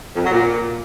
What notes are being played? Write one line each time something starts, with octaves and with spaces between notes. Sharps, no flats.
F2
F#3
A#2